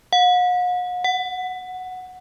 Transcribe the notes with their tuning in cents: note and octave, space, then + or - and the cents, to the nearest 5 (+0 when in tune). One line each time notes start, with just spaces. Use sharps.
F#5 -45
F#5 -5